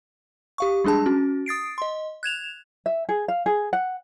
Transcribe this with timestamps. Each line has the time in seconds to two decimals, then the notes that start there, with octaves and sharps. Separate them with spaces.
0.58 G4 F5 C#6
0.84 G3 G#3 D4 G#4 A5
1.06 C#4 F#4
1.46 D#6 A6 C7 D7
1.78 D#5 C6
2.23 F#6 G#6 E7 F7
2.86 E5
3.09 G#4
3.28 F5
3.46 G#4
3.73 F#5